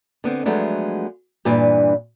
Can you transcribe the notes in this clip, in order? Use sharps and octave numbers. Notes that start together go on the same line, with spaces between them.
D3 B3 C4
F3 F#3 G#3 A3 B3 D4
G2 A#2 E3 D4 B4